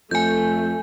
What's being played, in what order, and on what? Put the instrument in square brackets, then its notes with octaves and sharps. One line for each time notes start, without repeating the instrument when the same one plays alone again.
[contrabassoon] F2 [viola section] A3 [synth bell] G#5 G6